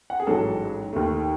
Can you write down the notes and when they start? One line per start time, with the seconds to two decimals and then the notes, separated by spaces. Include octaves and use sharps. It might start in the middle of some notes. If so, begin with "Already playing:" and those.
0.10 F#5
0.20 G#4
0.27 A1 G#2 F#3 A4
0.93 D#2 D#3 A3